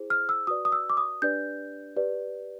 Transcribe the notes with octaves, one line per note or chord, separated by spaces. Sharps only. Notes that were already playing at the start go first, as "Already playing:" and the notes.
Already playing: E4 G#4 C5
F6
E6
F#4 B4 D5 D#6
D#6
E6
D6
D#6
D4 G4 B4 D5 G6
G4 B4 D5